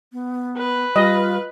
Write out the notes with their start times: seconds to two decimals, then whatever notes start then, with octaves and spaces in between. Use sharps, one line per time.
0.13 B3
0.58 B4
0.96 G3 F4 D#5